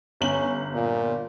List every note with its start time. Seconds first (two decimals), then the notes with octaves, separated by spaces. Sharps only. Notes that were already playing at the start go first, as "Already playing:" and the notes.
0.21 G1 C#4 F#7
0.74 A#2